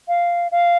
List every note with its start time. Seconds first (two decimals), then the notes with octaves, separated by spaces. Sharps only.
0.08 F5
0.52 F5